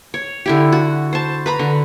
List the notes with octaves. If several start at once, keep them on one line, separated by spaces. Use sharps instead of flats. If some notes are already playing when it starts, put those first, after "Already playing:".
C#5
D3 E4 G4
F#4
C5 A5
B4 A#5 B5
D3